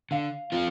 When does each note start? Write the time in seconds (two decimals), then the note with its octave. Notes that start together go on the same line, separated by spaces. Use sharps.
0.11 D3 F5
0.52 F3 C4 F4